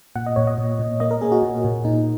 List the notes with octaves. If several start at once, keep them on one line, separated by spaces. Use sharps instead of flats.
A#2 F#5
D#5
A#2 C#5
D#5
A#2
A#2
A#3 D#5
A#4
A#3 G#4
F#4
A#2
A#2
A#2 D#4